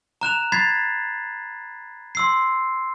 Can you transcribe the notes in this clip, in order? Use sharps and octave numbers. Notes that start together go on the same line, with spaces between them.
A#5 F#6 E7 F7
B5 G#6 A6 B6 C7
C6 E6 C7